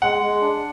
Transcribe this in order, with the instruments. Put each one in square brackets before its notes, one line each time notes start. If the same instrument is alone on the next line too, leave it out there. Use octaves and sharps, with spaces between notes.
[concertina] G#3 [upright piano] F#5
[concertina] G#3
D4